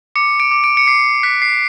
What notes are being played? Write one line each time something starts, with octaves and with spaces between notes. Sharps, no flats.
D6 C#7
D7
D6
D7
C#7
D6 C7
F#6 B6
C7